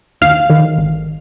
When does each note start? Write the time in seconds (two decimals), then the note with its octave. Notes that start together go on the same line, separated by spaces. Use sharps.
0.21 D#2 F5
0.50 D#3
0.78 G#1